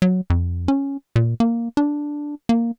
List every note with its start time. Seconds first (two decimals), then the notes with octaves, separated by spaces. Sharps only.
0.02 F#3
0.30 F2
0.68 C#4
1.16 A#2
1.40 A#3
1.77 D4
2.49 A#3